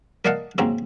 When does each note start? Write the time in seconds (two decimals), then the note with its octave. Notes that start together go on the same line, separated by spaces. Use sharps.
0.25 A#4 D5 D#5 F5 F#5 A5
0.58 D#2 G#2 C#3 F#3 C4 A#5